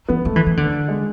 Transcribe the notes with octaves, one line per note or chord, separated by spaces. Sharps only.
E3 B3
G#3 A3
E3
E3
D3
G#3